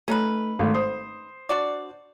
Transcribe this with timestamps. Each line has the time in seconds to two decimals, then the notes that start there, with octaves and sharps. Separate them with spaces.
0.08 A3 C#4 D#4 B4
0.59 G#1 A3
0.74 C5 D#6
1.49 D4 F#4 D5